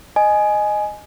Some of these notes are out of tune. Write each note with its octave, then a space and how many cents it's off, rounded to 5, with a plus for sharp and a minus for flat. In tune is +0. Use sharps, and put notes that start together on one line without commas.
D#5 -15 G#5 +10